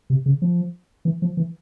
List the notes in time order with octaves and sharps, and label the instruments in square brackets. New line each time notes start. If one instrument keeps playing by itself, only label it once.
[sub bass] C3
C#3
F3
E3
F3
E3